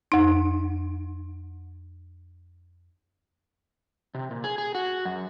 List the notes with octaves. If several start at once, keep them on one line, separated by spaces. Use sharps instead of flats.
F2 D#4
C3
A#2
G#4
G#4
F#4
F#2